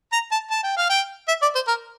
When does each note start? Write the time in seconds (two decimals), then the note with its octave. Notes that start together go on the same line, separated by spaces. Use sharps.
0.12 A#5
0.32 A5
0.51 A5
0.63 G5
0.77 F5
0.89 G5
1.28 E5
1.42 D5
1.55 C5
1.68 A#4